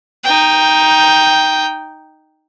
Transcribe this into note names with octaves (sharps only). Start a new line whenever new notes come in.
D#4 G5